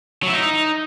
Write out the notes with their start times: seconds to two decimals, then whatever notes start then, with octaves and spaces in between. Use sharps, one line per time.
0.23 F#3
0.28 E4
0.33 D#4